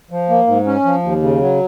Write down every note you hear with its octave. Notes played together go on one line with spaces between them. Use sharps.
F3
A#3
G#2
C#4
F3
D#2
C#3
F#3